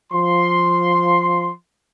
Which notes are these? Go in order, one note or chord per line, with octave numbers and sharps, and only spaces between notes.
F3 C6